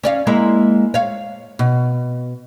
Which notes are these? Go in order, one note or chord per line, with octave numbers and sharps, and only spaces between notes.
C#4 D5 F5
G#3 A#3 E4
C#5 F5
B2